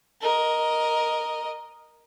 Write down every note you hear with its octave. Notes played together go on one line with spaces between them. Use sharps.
A#4 D#5